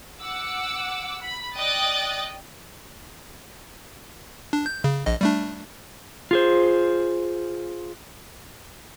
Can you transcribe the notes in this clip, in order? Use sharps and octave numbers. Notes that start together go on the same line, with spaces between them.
F#5 D6 E6
B5
D5 D#5 G5 D#6 F#6 A6
D4
G6
C#3
A#1 D#5
G3 A3 D4
F4 G#4 C5